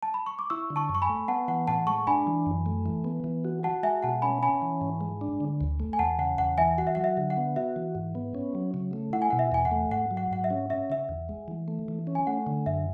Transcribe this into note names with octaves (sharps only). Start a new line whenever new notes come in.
A5
B5
C#6
D6
E4 C#6 E6
D3
A5 C#6
F#2
C#6
G#5 B5
A3
B3 F#5 A5
E3 F#5
A2 F#5 A5
G#3 A5 C#6
D4 G#5 B5
E3
F#2
A3
E3
B3
E3
F#4
F#4 F#5 A5
G#3 E5 G#5
B2 F#5 A5
C#4 G#5 B5
C#4 G#5 B5
E3
G#2
G#3
D4
D3
D2
A3
G#5
E2 F#5 A5
C#3 F#5
E2 F#5
E3 E5 G#5
F#4 F#5
E5
F#3 F#5
E5
D3
F#5
B3
F#4 E5
E3
G#2
B3
C#4
F#3
C#3
A3
E4 F#5
G#5
B2 F#5
E5
E2 G#5
F#5
A3
G#2 F#5
F#3
F#5
G#2 F#5
E5
C#4
C#4 E5
C#3 E5
E2
G#3
E3
A3
E3
C#4
G#5
A3 F#5
D3
F#2 E5